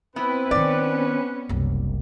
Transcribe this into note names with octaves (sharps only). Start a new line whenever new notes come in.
B3 C4 E4 B4
D#3 B3 C#4 D#4 D5
F#1 C2